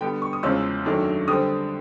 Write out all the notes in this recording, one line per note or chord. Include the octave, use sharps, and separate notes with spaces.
D3 G3 B3 G5
C#6
D#6
E2 C#3 F3 G#3 C#4 E6
F#2 D#3 F#3 A3 D4
D3 G3 C4 D#6